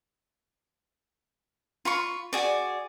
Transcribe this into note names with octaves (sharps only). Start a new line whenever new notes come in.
F4 B5 C#6
F#4 G#4 D5